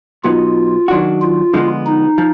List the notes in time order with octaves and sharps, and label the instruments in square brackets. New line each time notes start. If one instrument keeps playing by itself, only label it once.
[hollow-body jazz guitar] B2 F#3 B3 D#4 [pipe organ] F4
[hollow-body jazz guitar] D#3 F#3 D4 F#4
[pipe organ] F4
[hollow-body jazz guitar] D3 F3 G#3 B3
[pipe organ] D#4
[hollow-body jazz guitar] F3